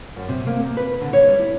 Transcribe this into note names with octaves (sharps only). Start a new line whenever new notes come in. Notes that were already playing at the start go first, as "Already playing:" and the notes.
F#2
C3
A#3
D#2
B4
D3
C#5
G3
E4